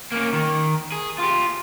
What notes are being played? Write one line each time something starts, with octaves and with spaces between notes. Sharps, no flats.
A#3 C#4
D#3
G#4
F4 G4